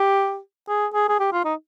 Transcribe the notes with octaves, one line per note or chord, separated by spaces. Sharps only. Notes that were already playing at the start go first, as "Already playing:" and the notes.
Already playing: G4
G#4
G#4
G#4
G4
F4
D#4